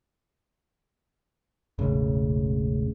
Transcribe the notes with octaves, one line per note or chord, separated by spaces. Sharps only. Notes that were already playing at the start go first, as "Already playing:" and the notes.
E1 A1 C#3